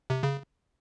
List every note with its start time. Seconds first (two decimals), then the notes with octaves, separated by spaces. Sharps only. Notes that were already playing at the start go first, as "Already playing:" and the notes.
0.10 C3
0.23 C#3